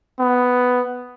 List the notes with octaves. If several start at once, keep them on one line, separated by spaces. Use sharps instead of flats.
B3